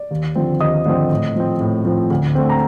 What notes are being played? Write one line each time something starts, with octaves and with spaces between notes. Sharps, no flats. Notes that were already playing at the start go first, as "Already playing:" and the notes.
Already playing: D5
D#2
D3 F3 C4
D#2 D#5 D#6
D3 F3 C4
A2
F3 C4
A2
F3 C4
D2
D3 A3 C4
A#5